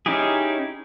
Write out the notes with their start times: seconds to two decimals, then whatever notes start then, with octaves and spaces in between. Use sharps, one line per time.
0.06 C#4 D#4 E4 G4 G#4